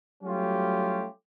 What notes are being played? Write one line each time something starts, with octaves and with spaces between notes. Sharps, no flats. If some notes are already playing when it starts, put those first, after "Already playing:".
F#3 G3 A3 C#4 F4 G4